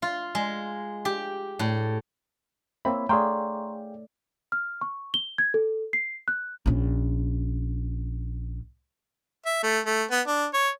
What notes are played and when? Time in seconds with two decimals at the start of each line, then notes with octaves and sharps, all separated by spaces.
0.02 F4
0.35 G#3
1.05 G4
1.59 A2
2.85 A#3 C4 C#5 E5 B5
3.09 A3 G#4 D5 F5 G5 A#5 C6 C#6
4.52 F6
4.81 C#6
5.14 G7
5.38 G#6
5.54 A4
5.93 C7
6.28 F#6
6.66 A#1 C#4
9.46 E5
9.63 A3
9.86 A3
10.11 B3
10.27 D4
10.54 C#5